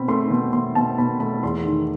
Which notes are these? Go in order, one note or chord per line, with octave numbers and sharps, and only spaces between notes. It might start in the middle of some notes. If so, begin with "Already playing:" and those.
Already playing: B2 C4 B5
A3 C6
B2
B2 C6
B2 A5
B2 B5
A3 B5
E2 C6
D#3